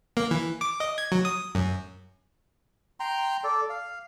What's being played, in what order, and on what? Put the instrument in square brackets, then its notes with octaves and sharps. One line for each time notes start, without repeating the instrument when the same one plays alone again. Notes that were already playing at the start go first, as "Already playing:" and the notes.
[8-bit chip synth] A#3
E3
D6
D#5
G#6
F#3
D#6
F#2
[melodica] G5 A#5 C6
A4 D5
F5